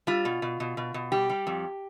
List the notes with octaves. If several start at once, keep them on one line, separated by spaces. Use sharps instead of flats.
G3 F4
B2
B2
B2
B2
B2
G3 G4
G3
F2